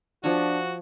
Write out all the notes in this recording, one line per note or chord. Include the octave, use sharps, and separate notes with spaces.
F3 D4 F#4 C#5